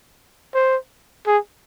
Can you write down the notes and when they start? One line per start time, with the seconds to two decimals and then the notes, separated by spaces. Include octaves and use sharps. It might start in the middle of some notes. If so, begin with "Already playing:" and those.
0.54 C5
1.27 G#4